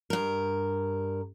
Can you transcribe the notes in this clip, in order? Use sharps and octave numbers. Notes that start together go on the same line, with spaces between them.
G2 A#4